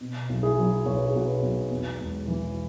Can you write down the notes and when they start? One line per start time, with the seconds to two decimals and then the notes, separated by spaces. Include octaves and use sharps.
0.01 B2
0.29 B1
0.43 E4 G#4
0.57 F#3
0.85 B1 C#5
0.96 B4
1.06 G#4
1.14 B2 F#4 B4
1.43 B1
1.71 E2
2.00 E1
2.28 E3